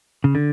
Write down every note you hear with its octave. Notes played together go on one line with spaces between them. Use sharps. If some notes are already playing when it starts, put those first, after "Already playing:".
C#3
D3